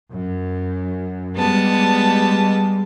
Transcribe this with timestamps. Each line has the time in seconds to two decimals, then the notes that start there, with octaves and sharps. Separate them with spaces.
0.11 F#2
1.36 G3 G#3 B3 A5